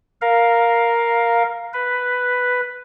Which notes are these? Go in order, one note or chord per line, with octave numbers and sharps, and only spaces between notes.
A#4 F5
B4